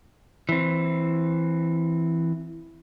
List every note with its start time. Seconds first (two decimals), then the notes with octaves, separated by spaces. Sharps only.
0.49 E3 C4